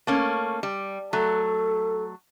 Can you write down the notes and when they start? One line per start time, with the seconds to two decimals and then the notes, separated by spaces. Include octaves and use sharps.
0.07 A3 A#3 C#4
0.63 G3
1.13 F#3 A3 A4